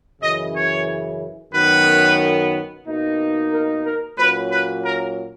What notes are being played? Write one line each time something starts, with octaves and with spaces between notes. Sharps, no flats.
F#2 C#3 E3 D#5
C#5
F#2 D#3 F#3 B3 B4
B2 A#3 D#4
A#4
A#4
A#2 F#3 C#4 B4
B4
A#4